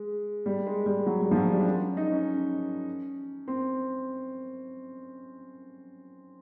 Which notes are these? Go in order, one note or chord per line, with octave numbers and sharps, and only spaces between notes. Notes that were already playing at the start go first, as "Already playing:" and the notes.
Already playing: G#3
G3
G#3
G3
F#3
G3
F3
F#3
G3
D4
C#4
D#4
C#4
C4